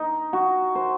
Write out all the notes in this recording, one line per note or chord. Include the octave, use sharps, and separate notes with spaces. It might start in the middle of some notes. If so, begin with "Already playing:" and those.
Already playing: D#4
F#4
C5